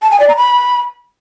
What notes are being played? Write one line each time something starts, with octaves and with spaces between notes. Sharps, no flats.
A5
G#5
D5
A#5
B5